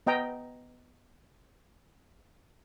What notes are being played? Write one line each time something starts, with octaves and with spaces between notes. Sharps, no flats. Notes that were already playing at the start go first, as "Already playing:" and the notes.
B3 D#5 G5 A#5